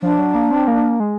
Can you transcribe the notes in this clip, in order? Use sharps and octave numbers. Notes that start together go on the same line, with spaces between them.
F3 D4
F#3
A#3
C4
A#3
G#3